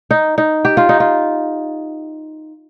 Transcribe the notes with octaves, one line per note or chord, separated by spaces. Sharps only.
D#4
D#4
G4
F4
D#4
F4